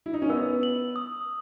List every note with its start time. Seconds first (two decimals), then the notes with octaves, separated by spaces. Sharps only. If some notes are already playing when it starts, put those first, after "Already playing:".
0.06 E4
0.14 D#4
0.22 C#4
0.29 B3 E6
0.63 F#7
0.96 D#6